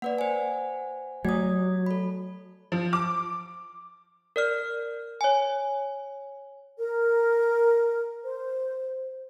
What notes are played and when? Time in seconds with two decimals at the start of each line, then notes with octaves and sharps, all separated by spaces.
0.02 A#3 B4 D5 F#5
0.18 C5 G#5
1.25 F#3 A3 D#6 G#6
1.86 A4 B5
2.72 F3
2.93 D6
4.36 A#4 D5 F6
5.21 C#5 G#5
6.78 A#4
8.23 C5